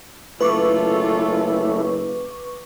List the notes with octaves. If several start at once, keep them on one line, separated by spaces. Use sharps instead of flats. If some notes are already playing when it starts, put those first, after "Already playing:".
F#1 A3 E4 F4 A4 B4 C#6 D6